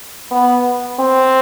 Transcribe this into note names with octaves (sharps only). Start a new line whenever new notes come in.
B3
C4